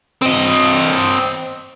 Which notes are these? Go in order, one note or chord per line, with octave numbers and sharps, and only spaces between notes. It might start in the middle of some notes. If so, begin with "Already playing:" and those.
C4 D#5